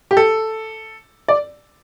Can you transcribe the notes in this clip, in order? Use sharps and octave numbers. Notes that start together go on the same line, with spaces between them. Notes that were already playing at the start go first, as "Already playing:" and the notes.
G4
A4
D5